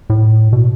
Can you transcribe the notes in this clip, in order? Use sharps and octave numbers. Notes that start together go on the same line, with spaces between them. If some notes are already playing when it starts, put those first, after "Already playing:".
A2
B2